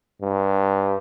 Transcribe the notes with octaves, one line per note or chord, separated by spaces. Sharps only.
G2